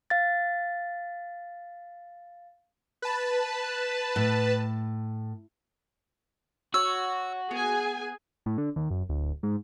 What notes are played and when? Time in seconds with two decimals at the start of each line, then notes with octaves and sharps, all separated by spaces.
0.10 F5 A6
3.02 B4 A5
4.16 A2
6.74 F#4 C#5 E6
7.51 B3 G#4 G#5
8.46 A2
8.58 D3
8.76 D#2
8.91 F#1
9.09 D1
9.43 G#2